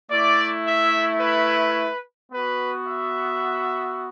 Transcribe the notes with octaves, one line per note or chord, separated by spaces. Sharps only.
A3 E4 D5
E5
B4
B3 F#4 B4
E5